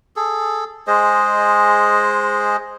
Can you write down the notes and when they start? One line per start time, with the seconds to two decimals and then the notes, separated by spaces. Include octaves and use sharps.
0.16 G#4 A4
0.87 G#3 G#4 C5 D#5